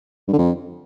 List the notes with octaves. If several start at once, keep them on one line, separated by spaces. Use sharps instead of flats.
G2
D3
F2